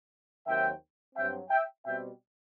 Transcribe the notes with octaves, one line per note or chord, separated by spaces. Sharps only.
D#2 D#3 F#3 C4 E5 G5
G2 F#3 C4 E5 G5
E5 G5
B2 G3 C4 E5 G5